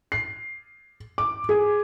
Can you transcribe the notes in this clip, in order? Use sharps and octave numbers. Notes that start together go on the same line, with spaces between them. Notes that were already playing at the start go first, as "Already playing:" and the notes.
C7
D6
G#4